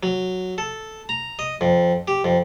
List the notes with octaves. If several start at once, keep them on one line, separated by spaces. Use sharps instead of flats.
F#3
A4
A#5
D#5
F2
G4
F2